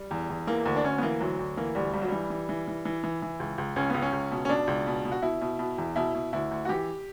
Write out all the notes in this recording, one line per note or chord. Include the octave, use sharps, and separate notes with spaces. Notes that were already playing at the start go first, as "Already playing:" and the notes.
Already playing: G3
E2
E2
E3 A#3
D2
D4
D2 C#4
B3
E3 A#3
D2 F#3
D2
E3 A#3
D2 G3
G2 G3
F#3
E3 G3
E3
E3
E3
E3
E3
E3
C#2
C#2
C#2 C#4
C#2 B3
C#4
C#2
B2
C#4
B2 D4
C#2
B2
B2
F#4
B2 E4
B2
B2
E2
B2 E4
B2
D2 E4
D2
F#4
E3 G4